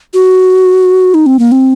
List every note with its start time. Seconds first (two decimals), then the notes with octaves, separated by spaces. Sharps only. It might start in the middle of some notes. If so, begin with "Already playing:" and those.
0.14 F#4
1.14 D#4
1.26 C4
1.39 A#3
1.52 C4